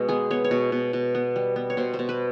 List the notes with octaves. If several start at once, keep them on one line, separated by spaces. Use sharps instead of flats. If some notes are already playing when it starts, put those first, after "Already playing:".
Already playing: B2 G#3
B3 G#4
B3 C#5
C#5
B2
B2
B2
B3
G3
B3
C#5
B2 C5
C5
B2
B4